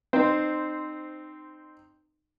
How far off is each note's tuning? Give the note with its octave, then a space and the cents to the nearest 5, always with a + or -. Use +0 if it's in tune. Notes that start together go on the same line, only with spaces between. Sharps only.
C4 -5 D#4 -25 C5 -10